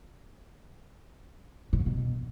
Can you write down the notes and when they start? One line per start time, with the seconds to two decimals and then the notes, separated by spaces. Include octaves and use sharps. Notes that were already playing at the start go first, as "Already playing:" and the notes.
1.73 B2
1.80 C#3
1.86 B2